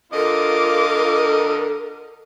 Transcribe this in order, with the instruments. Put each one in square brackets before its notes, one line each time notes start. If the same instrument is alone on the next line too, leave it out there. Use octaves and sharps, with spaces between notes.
[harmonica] D3 D#5 [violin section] F4 D6 [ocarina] A4 [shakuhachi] A#4